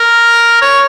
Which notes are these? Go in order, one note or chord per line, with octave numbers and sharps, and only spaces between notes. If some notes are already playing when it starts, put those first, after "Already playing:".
Already playing: A#4
C#5